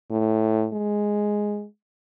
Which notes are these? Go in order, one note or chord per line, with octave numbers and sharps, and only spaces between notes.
A2
G#3